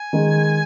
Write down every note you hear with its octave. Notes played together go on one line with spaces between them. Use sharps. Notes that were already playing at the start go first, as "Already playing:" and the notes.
Already playing: G#5
D#3 G#3